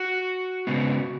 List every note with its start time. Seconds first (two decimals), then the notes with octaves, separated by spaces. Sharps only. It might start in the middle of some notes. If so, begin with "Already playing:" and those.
Already playing: F#4
0.67 C#3 G#3 B3